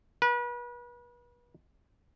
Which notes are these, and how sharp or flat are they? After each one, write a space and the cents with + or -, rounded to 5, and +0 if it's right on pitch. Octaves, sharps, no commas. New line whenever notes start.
B4 -35